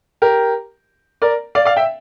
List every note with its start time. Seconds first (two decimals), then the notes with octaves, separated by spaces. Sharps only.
0.22 G4 A#4
1.22 A#4 D5
1.55 D5 F5
1.65 D5 F5
1.76 E5 G5